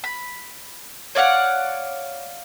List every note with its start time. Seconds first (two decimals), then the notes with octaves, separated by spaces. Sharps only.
0.04 B5
1.15 C#5 D5 F5 F#5